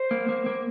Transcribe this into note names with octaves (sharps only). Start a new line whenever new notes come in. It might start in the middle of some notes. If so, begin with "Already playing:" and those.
Already playing: C5
A#3
A#3
A#3